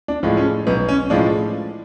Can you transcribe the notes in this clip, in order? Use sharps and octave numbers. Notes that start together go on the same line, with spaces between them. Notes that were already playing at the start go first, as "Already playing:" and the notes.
D4
A2 F3 G#3
C#4
B1 B3
C#4
A2 F3 G#3 D4